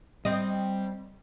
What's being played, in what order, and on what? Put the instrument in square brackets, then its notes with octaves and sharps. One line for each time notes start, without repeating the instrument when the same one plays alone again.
[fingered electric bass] G3 [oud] C4 D#5